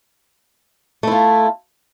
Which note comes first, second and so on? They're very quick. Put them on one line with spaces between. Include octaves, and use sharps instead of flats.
A3 E4 F4